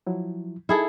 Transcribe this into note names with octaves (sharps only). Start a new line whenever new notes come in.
F3 F#3 E4
D#4 E4 G#4 A4